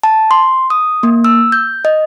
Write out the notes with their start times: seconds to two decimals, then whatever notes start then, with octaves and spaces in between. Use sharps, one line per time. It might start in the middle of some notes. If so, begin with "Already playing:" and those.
0.03 A5
0.31 C6
0.70 D#6
1.03 A#3
1.24 E6
1.52 G6
1.85 D#5